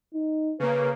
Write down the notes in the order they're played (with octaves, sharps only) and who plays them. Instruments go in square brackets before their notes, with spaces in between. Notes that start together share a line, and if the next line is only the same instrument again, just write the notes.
[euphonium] D#4
[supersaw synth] C#3 A#3 [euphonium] B4